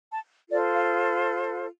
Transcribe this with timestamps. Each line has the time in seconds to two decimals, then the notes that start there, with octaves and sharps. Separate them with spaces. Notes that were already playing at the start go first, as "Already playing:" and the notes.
0.12 A5
0.49 F4 A4 C5 D5
0.73 F5